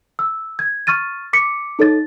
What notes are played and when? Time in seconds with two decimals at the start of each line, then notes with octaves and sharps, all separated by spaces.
0.19 E6
0.59 G#6
0.87 C#6 F6 A6 D#7
1.33 D6 B6 C#7
1.79 D#4 A4 C#5 A6